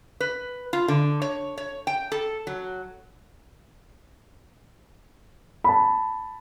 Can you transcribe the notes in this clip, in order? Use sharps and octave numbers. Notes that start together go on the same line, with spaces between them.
B4
F4
D3
C#5
C#5
G5
A4
F#3
A5 B5